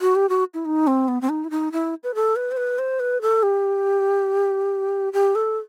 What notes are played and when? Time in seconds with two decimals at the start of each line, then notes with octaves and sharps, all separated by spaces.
0.01 F#4
0.15 G4
0.29 F#4
0.54 E4
0.65 D#4
0.87 C4
1.08 B3
1.21 C4
1.29 D#4
1.44 E4
1.51 D#4
1.72 E4
2.03 B4
2.15 A4
2.36 B4
2.51 C5
2.57 B4
2.79 C5
3.00 B4
3.22 A4
3.43 G4
5.13 G4
5.35 A4